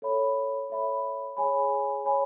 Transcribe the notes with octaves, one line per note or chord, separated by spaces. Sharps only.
A4 C#5 E5 B5
A4 C#5 E5 B5
G#4 C#5 G#5 B5
G#4 C#5 G#5 B5